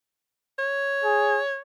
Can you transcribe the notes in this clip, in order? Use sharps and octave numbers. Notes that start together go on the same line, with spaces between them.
C#5
G#4